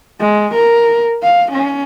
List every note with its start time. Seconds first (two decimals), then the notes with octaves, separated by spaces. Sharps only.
0.20 G#3
0.55 A#4
1.22 F5
1.52 C#4